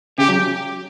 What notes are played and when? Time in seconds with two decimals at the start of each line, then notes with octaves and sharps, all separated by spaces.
0.18 C#3 G4
0.29 F#3